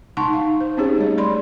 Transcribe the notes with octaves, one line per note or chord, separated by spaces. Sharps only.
D#4 F#5 A5 C6 C#6
D#4 F5
C5
C4 C#4 D#4 G4 G#4 C#5
G3 A3 C#5
D5 B5 C6